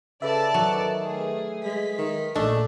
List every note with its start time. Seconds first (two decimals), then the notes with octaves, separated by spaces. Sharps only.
0.22 C#3 A4 B4 D5 E5 A5
0.54 D#3 F#3
1.01 A3 G#4
1.64 G#3 B6
1.98 D#3
2.36 A#1 A3 D4 D#5